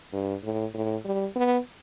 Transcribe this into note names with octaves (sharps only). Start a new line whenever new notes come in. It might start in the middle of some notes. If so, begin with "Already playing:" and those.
G2
A2
A2
G3
B3